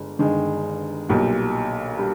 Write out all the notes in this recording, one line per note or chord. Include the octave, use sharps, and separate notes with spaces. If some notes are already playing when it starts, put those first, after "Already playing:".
Already playing: G1 G#3
G1 G2 D#3 G#3
B1 A#2 G3
G3